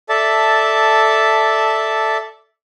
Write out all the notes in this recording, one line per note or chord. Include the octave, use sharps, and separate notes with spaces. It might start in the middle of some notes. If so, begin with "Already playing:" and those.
A4 D5 E5 A5